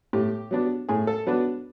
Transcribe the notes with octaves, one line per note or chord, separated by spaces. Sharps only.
A2 G4
F#3 B3 D4
A2 G#4
A4
F#3 B3 D4 B4